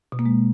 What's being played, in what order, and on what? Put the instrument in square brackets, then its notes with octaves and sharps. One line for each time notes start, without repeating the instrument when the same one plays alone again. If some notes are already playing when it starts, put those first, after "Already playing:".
[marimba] B2
A#3
G#3